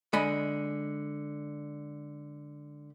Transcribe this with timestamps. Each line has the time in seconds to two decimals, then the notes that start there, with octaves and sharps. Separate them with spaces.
0.13 D3 G#3 D#5 B5